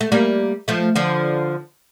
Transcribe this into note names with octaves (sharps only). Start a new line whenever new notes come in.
A3
G3 A#3
F3 A3
D3 F3